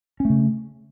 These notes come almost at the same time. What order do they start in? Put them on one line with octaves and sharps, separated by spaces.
C#4 A3 C#3